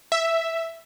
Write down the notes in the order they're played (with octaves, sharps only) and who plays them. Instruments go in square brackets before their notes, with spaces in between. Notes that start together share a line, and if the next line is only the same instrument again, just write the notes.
[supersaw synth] E5